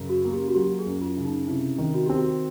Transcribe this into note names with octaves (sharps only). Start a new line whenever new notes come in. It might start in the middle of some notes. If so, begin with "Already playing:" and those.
Already playing: F#2 C#3
F#4
A#3
G4
F#4
F#3 G4
G#4
F#2
F4
C#3
D#4
C3 E4
D#3
F#4
C4 G4
F#4